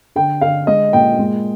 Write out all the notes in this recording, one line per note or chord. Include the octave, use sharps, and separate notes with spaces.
D3 G5
D3 F5
G#3 D#5
A#2 G5
G#3